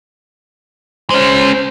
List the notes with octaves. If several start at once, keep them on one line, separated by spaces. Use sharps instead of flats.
G#3 C#4 C5